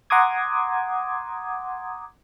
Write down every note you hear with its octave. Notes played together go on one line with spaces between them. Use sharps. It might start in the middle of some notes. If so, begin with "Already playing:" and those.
F#5 A#5 C6 D6 D#6 G#6